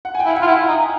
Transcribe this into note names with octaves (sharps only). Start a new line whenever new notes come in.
F#5
G#5
G5
E4
F5
F#5
F4
E4
F#5
D#4